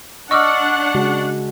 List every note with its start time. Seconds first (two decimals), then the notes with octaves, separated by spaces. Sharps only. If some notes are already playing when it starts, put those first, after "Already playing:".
0.31 D4 D#5 F#5 C#6 D6 E6 F6
0.95 C#3 G#3 F#4